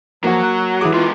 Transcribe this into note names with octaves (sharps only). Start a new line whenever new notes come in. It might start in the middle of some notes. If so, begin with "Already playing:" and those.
F3 F#3 A#3 F#4
F#5
E3 G#4 D6
G#3 B3 F4